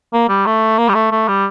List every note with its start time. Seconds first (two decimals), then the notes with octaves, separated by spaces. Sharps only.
0.13 A#3
0.29 G3
0.46 A3
0.79 A#3
0.89 G3
0.95 A3
1.12 A3
1.28 G3